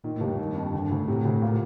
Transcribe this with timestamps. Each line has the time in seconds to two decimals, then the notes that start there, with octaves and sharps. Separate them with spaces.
0.04 A#2 D#3
0.16 A2
0.21 D#2
0.27 G2
0.38 G2 D#3
0.55 F2
0.73 D3
0.91 D2
1.08 A2 C3
1.25 D2
1.42 A#2